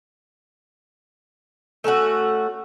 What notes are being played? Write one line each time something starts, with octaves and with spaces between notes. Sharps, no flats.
A3 C#4 D4 F#4